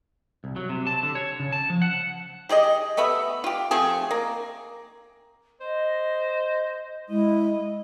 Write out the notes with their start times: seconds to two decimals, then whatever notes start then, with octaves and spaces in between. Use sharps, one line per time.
0.44 C2
0.56 F#3
0.69 C3
0.87 A5
1.03 D3
1.15 C#5
1.40 C#3
1.52 A5
1.70 F3
1.82 F#5
2.49 G4 G#4 D5 D#5
2.97 A3 B3 E5 B5
3.44 F4 G4
3.71 F3 A3 C4 G#4
4.11 A#3
5.61 C5 D#5
7.09 G#3 E4 D#5